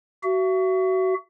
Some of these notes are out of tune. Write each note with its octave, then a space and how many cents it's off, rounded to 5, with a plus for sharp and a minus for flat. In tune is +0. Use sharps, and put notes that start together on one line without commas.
F#4 +25 E5 +35